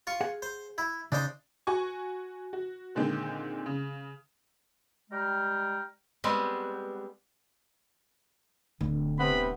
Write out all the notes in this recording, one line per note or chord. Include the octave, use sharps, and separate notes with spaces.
F4 C#6
G#4 F#5
C5
E4
C#3 D4 D#4 C5
F#4 G#5 C#6
F#4
A#2 D3 D#3 G#3 C4
C#3
G3 G#3 G5 A#5 F6
G3 G#3 B3 C4
D1 D3
C3 B3 C4 B5